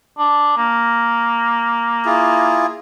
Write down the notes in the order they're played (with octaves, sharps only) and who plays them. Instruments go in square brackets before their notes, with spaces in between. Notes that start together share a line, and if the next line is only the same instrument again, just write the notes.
[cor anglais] D4
A#3
[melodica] E4 F4 G#4